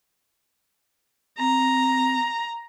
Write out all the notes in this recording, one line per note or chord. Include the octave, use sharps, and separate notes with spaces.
C4 A#5